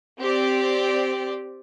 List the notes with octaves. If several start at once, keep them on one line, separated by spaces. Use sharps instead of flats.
C4 G4 D5